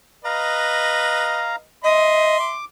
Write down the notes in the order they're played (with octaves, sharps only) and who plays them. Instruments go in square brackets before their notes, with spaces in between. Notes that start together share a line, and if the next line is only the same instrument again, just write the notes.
[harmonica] B4 D#5 [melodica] F5 A#5
[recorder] D#5 [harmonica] E5 C6
[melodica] D6